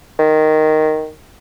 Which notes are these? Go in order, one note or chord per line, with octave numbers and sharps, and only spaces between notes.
D#3